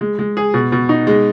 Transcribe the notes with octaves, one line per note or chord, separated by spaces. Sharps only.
G#3
G#3
G#4
B2
B2
D#4
G#3